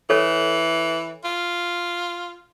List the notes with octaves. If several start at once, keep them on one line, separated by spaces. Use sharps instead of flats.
E3 A4 C#5
F4